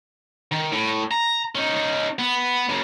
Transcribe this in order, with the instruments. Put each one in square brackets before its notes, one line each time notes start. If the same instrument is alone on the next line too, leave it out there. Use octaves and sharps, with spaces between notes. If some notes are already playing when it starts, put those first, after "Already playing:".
[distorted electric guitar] D#3
A2
A#5
C#4 D#4
B3
F#2 C#3